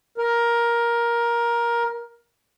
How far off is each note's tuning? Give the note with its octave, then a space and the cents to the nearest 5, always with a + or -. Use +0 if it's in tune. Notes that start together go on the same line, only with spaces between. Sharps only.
A#4 +15